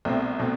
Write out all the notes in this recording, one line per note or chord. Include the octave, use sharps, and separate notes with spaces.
C2 B2 A3 C4
B2 A3 C4